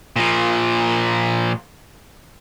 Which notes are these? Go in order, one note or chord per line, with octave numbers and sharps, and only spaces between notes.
A#2 F3